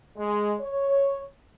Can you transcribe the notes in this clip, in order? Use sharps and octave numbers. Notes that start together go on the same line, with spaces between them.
G#3
C#5